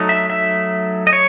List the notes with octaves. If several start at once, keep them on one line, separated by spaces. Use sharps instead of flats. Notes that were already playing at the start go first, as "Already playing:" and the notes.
Already playing: F#3 A3 D#4
E5
E5
D#5
C#5